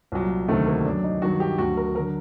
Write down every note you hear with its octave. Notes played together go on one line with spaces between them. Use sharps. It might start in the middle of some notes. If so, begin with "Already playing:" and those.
C2 A#2 F#3
D2 C3 D#3 F#3 A3
A#3
F#2 F#3 D4
D#4
G2 D#3 F#3 F#4
G4
D2 D3 F#3 F#4
A#4
D3 F#3 A#4